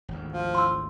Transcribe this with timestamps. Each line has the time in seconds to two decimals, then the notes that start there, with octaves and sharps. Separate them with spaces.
0.09 G#1 D2
0.32 F3
0.55 C6 E6